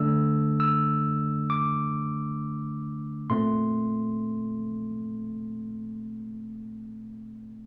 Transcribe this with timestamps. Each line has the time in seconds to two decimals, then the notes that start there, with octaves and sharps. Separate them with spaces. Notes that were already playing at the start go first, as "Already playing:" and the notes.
Already playing: D3 A3 D4 E6
0.60 E6
1.50 D6
3.30 A#2 A3 C4 C6